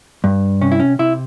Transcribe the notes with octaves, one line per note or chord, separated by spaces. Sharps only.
G2
C3 C#4
E4
C#4
C3 E4